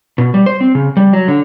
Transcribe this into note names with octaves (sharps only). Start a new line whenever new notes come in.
B2
G3
C5
C4
C#3
G3
F#3
D3